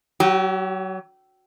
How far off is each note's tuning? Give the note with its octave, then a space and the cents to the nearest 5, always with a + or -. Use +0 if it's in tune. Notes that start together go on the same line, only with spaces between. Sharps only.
F#3 +25 G4 -25